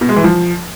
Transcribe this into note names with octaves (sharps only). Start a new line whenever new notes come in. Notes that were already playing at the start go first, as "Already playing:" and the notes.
B2
G#3
E3
F3